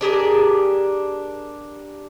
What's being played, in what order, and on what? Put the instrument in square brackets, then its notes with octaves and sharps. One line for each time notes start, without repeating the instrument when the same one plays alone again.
[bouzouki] D4 G4 G#4 A#4